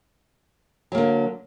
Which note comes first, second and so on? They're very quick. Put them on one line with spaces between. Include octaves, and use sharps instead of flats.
F#3 A#3 D3